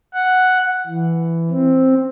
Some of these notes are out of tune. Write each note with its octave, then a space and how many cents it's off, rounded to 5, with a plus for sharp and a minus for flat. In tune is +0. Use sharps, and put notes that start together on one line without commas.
F#5 +0
E3 +10
C4 +5